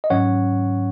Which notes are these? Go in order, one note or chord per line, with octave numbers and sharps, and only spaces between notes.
D#5
G#2 D#3 F#3 C#4 C#5 F#5